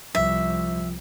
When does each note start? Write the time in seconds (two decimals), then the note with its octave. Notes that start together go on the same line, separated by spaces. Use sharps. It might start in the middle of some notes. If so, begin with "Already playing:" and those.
0.15 C2 F3 E5